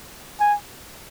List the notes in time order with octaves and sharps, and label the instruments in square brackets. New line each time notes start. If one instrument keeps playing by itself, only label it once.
[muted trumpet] G#5